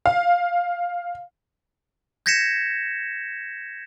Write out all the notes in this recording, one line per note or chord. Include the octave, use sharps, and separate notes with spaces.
F5
G6 G#6 A#6 B6 C#7 E7